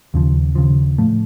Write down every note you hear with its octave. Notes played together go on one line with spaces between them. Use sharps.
D#2 C#3 F3
D#2 C#3 F3
A2 F3 A3